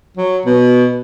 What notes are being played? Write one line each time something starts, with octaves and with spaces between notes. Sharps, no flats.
F#3
B2